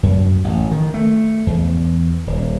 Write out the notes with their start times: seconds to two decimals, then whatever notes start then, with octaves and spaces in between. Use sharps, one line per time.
0.03 F#2
0.44 A1
0.72 D#3
0.94 A3
1.47 E2
2.27 D#1